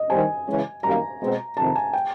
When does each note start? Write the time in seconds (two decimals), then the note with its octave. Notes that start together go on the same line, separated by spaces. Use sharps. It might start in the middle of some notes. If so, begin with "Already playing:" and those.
Already playing: D#5
0.10 D#3 G3 C4 G#5
0.46 C#3 E3 G#3 C#4
0.83 F#2 D#3 G3 A#3 A#5
1.20 B2 G#3 C4
1.57 F2 C3 D#3 A5
1.75 G#5
1.93 G5